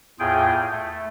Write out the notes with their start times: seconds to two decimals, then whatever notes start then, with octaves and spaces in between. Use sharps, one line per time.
0.20 E2 A2 F4 G#4 G5
0.72 A3